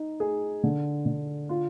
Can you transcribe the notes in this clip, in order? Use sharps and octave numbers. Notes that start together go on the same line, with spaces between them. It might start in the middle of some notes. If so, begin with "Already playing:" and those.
Already playing: D#4
G#4
D3
D3
F4